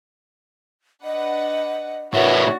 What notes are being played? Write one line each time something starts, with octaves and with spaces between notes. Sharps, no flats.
D4 B4 D#5 F#5
A2 B3 D4 F#4 C#5 E5